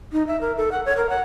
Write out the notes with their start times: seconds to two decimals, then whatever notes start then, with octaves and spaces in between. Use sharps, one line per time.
0.13 D#4
0.27 E5
0.41 A#4
0.57 A4
0.72 F#5
0.85 C#5
0.97 A#4
1.09 F#5